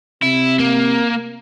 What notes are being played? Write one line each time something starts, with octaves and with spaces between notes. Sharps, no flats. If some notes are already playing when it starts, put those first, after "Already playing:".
C3 E4
A#3